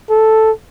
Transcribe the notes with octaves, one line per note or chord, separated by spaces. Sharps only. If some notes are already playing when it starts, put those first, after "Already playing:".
A4